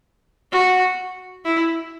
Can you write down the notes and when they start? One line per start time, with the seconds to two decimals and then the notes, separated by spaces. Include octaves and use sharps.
0.52 F#4
1.45 E4